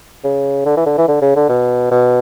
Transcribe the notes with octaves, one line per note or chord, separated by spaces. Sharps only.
C#3
D3
E3
D3
E3
D3
C#3
D3
B2
B2